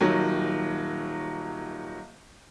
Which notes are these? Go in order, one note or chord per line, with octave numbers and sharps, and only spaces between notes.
D#1 D#3 F#3